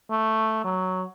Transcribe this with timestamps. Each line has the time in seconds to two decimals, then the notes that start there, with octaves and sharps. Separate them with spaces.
0.10 A3
0.64 F#3